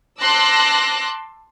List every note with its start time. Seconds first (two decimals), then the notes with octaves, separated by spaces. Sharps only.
0.19 A5 C6 D6 E6 F#6 A#6